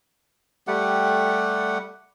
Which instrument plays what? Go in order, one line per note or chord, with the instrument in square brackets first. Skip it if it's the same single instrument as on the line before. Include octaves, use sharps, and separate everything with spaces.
[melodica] G3 A3 G4 F#5